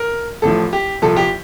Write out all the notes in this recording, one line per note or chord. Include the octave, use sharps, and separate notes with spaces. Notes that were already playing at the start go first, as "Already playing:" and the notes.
Already playing: A#4
A1 A2 F3 A4
G4
C2 A#2 F3 A4
G4